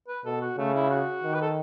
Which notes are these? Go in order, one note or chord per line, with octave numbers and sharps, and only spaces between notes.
B4
B2 A4
F#4
C#3 A3
E4
F#4
D#3
B4
A4